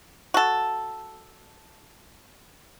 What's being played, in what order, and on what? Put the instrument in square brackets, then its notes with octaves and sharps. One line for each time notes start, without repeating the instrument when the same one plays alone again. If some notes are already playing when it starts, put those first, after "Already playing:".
[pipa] F#4 A4